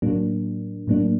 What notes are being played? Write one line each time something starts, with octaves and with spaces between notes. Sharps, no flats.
A2 F#3 A#3 D4
A2 F#3 A#3 D4